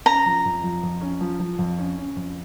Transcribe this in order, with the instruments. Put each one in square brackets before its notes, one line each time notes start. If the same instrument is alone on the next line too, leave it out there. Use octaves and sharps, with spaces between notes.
[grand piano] C#4 [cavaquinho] A#5
[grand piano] F3
F2
F3
F2
C#4
F3
F3
F2
C#4
C#4
F2